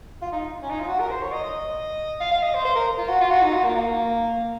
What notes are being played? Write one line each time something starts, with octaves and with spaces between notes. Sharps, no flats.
F4
D#4
C#4
D#4
F4
F#4
A#4
C5
C#5
D#5
D#5
F5
F5
D#5
C5
C5
A#4
F4
F#4
F4
F#4
D#4
F#4
A#3
A#3